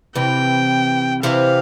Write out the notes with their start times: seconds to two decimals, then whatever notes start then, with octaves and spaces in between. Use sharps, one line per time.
0.15 C3 E3 G5
1.23 C3 E3 F5